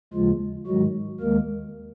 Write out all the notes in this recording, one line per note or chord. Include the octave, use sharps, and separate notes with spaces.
D#2 C#3 F3 G#3 F4
G#2 D#3 F#3 G#3 F#4
D#2 D#3 G#3 A#3 A#4